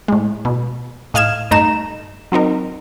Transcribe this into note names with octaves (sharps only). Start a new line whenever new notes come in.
A2 G#3
B2
A2 D#5 F5 F6 G#6 E7
G2 A3 D#4 A#5 E7
F#3 C4 D#4 A#4